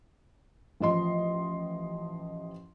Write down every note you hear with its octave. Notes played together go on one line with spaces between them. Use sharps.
A1 F3 D#5 C6